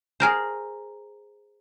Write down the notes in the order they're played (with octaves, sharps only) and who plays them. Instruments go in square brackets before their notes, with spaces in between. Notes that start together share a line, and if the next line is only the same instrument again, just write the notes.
[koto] G#4 A#4 C5